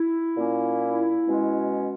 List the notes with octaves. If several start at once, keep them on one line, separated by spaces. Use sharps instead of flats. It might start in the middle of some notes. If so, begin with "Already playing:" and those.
Already playing: E4
A#2 A#3 C#4
B2 G#3 C#4